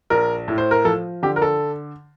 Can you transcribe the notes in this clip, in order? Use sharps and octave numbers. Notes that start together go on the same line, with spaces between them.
A#1 A#4
A2
C5
A#4
F3 A4
D3 G4
A#4
A4